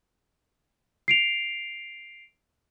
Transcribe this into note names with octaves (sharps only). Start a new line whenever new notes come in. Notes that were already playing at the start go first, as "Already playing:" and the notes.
C7 D7 F7